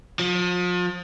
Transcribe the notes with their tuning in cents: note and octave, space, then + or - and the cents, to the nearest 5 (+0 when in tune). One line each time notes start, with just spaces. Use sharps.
F3 +35